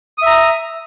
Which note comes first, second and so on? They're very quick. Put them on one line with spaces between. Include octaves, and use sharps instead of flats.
D#6 E5 A#5